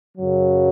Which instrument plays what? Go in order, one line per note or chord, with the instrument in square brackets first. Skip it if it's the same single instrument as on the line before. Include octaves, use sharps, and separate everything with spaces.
[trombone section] F#2 C#3 F#3